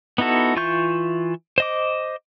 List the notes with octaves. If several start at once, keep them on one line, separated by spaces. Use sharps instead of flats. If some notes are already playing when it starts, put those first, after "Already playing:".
B3 D#4 E4 F#4 A4
E3 F4 E5 C#6 G6
C5 D#5 D6